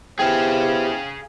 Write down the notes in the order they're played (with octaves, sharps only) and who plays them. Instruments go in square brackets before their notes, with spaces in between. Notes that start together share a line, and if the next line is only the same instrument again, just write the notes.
[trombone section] B3 E4 C5 [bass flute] G4 [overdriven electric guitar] G#4 F5 [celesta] G5